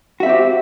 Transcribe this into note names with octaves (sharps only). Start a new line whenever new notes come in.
C4 F#4 G4 E5